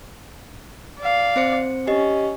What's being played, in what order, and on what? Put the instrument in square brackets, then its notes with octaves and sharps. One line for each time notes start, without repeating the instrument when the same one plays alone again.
[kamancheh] D5 F5
[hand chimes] C4 C5 C#7
[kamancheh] C#4 [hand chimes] G4 D#5